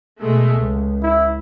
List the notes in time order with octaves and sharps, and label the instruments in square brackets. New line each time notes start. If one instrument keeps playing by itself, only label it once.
[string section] B2 G#3 A3
C#2
[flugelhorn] E4